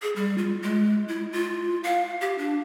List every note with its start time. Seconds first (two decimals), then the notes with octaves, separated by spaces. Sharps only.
0.02 G#4
0.16 G3
0.38 F4
0.62 G#3
1.08 E4
1.33 F4
1.84 F5
2.21 G4
2.38 D4